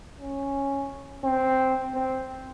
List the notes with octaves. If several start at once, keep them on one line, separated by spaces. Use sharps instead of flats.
C#4
C4
C4